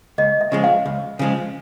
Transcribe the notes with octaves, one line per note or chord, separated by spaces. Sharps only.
C#2 D#5
E5
C#3 F3 G#3
F5
C#2
C#3 F3 G#3